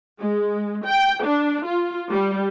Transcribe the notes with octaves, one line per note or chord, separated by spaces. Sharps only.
G#3
G5
D4
F4
G3